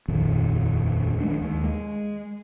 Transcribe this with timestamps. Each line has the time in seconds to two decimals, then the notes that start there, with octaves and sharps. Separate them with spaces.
0.08 D#1 A#1 F2 D#3
1.20 D#3 G#3 A3 D4
1.41 D#2
1.64 G#3